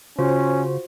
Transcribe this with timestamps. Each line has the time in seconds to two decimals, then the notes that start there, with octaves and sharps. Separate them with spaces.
0.19 C#3 C#4 F4 F#4 C5